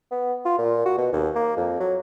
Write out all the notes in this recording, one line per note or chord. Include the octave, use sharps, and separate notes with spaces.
B3
F4
A#2
F#4
B2
D#2
A#3
F2
F#3